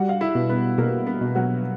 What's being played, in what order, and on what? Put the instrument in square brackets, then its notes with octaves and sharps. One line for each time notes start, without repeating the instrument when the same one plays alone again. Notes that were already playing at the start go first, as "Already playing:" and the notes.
Already playing: [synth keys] G3 [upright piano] F#4 F#5
[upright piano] F5
E4 E5
[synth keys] B2
[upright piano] B3 B4
[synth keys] B2 [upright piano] A#3 A#4
[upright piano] B3 B4
[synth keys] B2
[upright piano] F#3 F#4